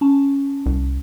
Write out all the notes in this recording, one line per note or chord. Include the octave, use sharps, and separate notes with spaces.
C#4 A5
C2